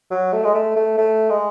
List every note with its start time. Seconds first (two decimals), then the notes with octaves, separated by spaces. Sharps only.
0.11 F#3
0.33 A3
0.44 G#3
0.54 A3
0.76 A3
0.98 A3
1.30 G#3